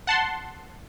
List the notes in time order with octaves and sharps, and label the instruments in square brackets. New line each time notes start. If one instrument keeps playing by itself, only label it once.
[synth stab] F#5 A5 C6